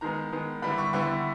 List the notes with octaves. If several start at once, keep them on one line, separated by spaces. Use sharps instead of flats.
D#3 G#3 B3 A#5
D#3 G#3 B3
D3 G3 B3 E4 B5
C#6
D3 G3 B3 E4 C#6